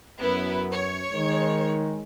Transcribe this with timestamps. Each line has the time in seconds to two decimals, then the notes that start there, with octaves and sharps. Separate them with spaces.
0.21 F#2 B3 E4 B4
0.71 C#5
1.13 D#3 G#3